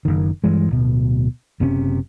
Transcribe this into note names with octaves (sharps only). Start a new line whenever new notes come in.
F#1 D#3
G2 E3 G#3
D1 B2
F#1 C3 C4 C#4